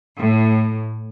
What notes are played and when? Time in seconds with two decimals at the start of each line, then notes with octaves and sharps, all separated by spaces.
0.16 A2